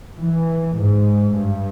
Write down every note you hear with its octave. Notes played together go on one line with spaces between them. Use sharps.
E3
G#2
G2